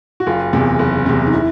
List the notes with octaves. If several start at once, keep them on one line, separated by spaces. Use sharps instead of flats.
F#4
F#1 F4
E2 C3
F#1
E2 C3
D#4
E4